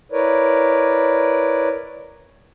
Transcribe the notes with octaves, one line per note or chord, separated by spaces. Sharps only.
E4 A#4 B4 C#5 D5